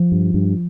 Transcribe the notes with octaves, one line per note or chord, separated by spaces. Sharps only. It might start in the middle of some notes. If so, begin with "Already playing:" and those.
Already playing: F3
G2
G2